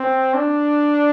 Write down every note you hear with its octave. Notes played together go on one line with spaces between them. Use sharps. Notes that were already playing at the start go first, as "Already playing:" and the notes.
Already playing: C4
D4